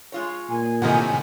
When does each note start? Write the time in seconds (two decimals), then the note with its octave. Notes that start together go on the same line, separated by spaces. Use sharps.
0.12 G#3 F4 C#5
0.50 A#2 G#5
0.82 A2 C3 D#3 D#4 A#4 F#5